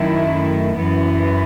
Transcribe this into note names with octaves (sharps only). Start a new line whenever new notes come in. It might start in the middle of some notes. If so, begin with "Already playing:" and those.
Already playing: F#2 D#3 A3 E4
F#2 E3 B3